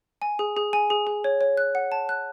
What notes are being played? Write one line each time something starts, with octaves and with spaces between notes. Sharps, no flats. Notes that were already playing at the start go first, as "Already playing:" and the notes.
G#5
G#4
G#4
G#5
G#4
G#4
C#5
C#5
F#6
F#5
A5
F#6